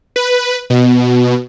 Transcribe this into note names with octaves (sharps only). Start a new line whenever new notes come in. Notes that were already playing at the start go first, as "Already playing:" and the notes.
B4
B2